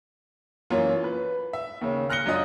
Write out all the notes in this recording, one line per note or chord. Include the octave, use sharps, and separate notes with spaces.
F#2 E3 A#3 C#4 F4
B4
E5
D#2 C#3
F6 F#6 A#6 C#7 G7
F#2 D4 F4 D#5 D#6